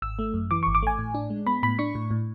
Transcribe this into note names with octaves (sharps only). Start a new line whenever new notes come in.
G#1 E6
A3
F#2
E3 D6
C#6
G#1
D6
A3 G#5
A2
D4
G#3
B3 B5
A2 B5
D4 C#6
A2
A2